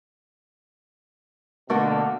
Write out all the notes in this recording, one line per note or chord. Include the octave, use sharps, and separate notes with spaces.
B2 D3 A3 A#3 F#4